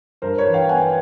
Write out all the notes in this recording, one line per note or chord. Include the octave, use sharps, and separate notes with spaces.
G2 A#4 C5
B4 C#5
E3
F5 G5
B3 F#5 G#5